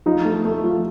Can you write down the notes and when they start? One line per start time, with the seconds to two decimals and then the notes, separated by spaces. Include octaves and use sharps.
0.06 F3 D#4
0.25 A3
0.45 A3
0.64 F3